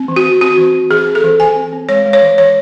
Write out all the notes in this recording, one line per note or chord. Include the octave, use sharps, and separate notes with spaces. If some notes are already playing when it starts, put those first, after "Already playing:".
Already playing: C4
E3
F#4
E3
C4 F#4
E3
C4
E3 G#4
C4
A4
E3
E3 G#5
C4
C4
G#3 C#5
G#3
C#5
E3
E3 C#5